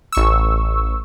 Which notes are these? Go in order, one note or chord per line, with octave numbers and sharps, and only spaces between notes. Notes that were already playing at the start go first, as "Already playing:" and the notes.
A1 C#6 E6